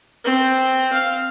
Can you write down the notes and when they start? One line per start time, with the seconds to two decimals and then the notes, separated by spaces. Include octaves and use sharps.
0.24 C4
0.93 F5